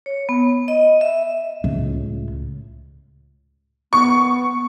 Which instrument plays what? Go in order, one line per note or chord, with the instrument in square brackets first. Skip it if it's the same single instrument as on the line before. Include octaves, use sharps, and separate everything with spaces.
[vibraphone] C#5
B3
D#5
E5
[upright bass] C#2 A2
[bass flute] B3 [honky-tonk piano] C#6